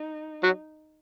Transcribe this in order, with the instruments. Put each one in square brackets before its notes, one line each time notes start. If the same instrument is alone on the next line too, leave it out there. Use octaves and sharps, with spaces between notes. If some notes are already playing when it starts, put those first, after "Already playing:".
Already playing: [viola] D#4
[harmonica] F#3